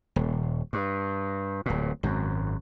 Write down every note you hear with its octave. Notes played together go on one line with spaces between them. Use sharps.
D#1
G2
D1 A#2
G#1 F#2